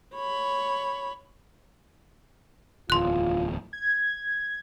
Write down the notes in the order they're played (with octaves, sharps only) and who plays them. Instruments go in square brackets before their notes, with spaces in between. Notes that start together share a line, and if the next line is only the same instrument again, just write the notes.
[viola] C#5 B5
[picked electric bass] D1 E2 [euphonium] F4 [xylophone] C6 F#6
[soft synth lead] G#6